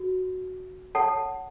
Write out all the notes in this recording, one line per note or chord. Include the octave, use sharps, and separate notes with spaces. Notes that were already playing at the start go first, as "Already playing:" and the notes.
Already playing: F#4
A4 C#5 F#5 A5